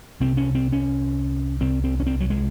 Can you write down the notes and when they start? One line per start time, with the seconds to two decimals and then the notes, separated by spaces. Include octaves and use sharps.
0.20 C2 C3 C4
0.37 C#4
0.55 C4
0.73 C#4
1.61 C2 C3 C4
1.84 C4
2.00 C#4
2.06 C4
2.20 F#3
2.30 G#3